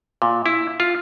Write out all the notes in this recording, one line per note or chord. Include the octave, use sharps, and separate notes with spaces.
A#2
E4
F4